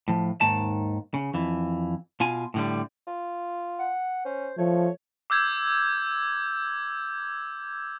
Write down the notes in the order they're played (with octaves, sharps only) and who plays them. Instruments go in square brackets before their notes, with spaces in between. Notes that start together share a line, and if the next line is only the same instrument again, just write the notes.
[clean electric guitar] A2 F3
D#2 G#2 D#3 A5
C#3
F2 E3
B2 F4 G#5
A2 D3 G3
[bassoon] F4
[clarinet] F#5
[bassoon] C#4 [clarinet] C5
[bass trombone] F3 [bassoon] A3 [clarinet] C#5
[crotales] D6 E6 G6 G#6